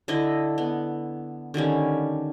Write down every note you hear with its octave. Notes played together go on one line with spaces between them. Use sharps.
D3 E4 D#5
B3
D3 D#3 G3 C#4